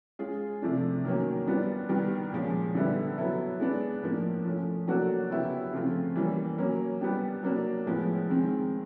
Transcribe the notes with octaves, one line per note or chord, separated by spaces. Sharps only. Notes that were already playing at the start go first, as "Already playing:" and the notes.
G#3 C#4 F4 G#4
C3 F3 A3 D4
D#3 F#3 A#3 C#4
G3 B3 D4 F4
D#3 G3 B3
A#2 F3 G#3 C#4
D3 G3 B3 E4
F#3 B3 E4 A4
G#3 B3 D4
A2 F3 A#3 D4
F3 A3 C#4
F#3 A#3 D4 F#4 A4
C#3 F#3 B3 E4 G4
C#3 F3 A3 C4 F4
E3 G3 A#3 C#4
F#3 A#3 C#4
G3 B3 D4 G4
F#3 A#3 D4
A2 F3 G#3 B3
D#3 G#3 C4